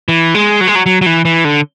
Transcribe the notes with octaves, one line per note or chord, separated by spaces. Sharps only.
E3
G#3
F#3
G#3
F#3
F#3
F#3
E3
E3
D3